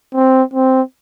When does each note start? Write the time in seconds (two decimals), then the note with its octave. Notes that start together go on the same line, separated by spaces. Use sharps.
0.15 C4
0.54 C4